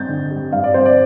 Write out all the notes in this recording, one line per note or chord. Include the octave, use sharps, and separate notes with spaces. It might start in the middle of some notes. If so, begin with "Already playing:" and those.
Already playing: G2 C4 G6 A6
D3
G3
G2 F5
D5
C4 C5
D5